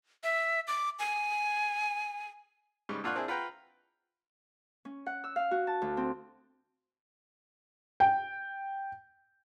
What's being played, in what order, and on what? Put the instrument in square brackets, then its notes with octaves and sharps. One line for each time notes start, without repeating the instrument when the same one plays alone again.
[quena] E5
D6
G#5
[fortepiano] G#2 C#3 G3
A#2 D4 F4 F#5 C#6 F#6
C4 D4 E4 G#4
F4 B4 F#5 G5 A#5
[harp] C#4
F#5
E6
F5
F#4
A5
D2
C4
[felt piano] G5